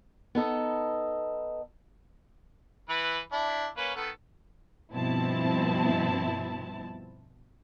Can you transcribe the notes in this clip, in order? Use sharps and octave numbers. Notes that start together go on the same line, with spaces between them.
B3 D#4 A4 D#5
E3 B4
D4 E4
A#3 C#4 B4
D#3 B3 A4
G2 B2 F3 C4 E4 A5